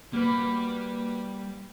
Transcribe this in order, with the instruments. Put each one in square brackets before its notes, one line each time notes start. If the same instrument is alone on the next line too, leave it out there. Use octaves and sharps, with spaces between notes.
[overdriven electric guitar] G3 [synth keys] A#3 [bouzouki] F#4 B4